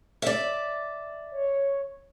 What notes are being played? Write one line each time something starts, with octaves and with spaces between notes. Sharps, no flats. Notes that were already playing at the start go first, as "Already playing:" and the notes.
D5 E5
C#5